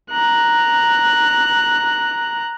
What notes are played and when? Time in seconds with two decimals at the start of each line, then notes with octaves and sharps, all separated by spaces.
0.11 A#5 F#6